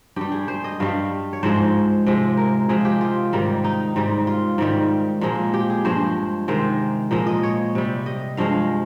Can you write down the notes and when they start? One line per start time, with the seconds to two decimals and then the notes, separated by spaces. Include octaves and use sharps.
0.16 G2 G3 G4
0.32 G#4
0.48 C5
0.64 D#5
0.80 G2 G3 F5
1.33 C#5
1.43 G#2 F3 G#3 C5
2.06 C3 F3 G#3
2.37 A#4
2.69 C3 F3 G#3 G#4
2.85 G4
3.01 F4
3.33 G#2 D#3 G3
3.64 D#4
3.96 G#2 G3
4.27 F4
4.58 G#2 D#3 G3
5.21 A#2 F3 G#3
5.54 G4
5.70 G#4
5.85 G2 F3 G#3 C5
6.48 C3 D#3 G#3 C5
7.11 A#2 F3 G#3 D#5
7.27 D#5
7.43 C#5
7.75 C3 G3
8.06 D#5
8.37 G2 F3 G#3 F5